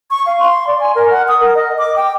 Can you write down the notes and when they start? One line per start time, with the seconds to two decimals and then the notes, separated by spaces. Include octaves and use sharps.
0.11 C#6
0.26 F5
0.39 C6
0.67 D5
0.80 G#5
0.95 A#4
1.10 F#5
1.28 D#6
1.41 A#4
1.55 D#5
1.78 D6
1.96 G5